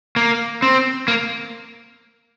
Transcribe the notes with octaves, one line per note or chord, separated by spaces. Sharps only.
A#3
C4
A#3